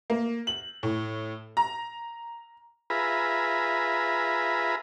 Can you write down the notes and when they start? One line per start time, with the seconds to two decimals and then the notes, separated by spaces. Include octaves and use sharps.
0.10 A#3
0.47 F#7
0.83 A2
1.57 A#5
2.90 F4 G#4 B4 E5 A#5 B5